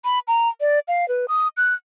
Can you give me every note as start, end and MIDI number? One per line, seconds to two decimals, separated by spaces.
0.04 0.19 83
0.28 0.49 82
0.61 0.79 74
0.88 1.08 77
1.08 1.26 71
1.28 1.48 87
1.57 1.74 90